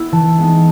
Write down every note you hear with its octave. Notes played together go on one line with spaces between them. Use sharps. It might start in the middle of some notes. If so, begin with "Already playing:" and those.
Already playing: B3 E4
E3 A5
G#3 B3 D#4